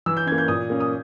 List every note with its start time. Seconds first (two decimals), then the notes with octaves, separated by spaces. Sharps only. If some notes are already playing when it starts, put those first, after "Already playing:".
0.06 E3 E6
0.17 G6
0.27 C#4 G#6
0.32 A#3
0.38 G6
0.48 A#2 D#6
0.70 A#3 C#4
0.80 D#6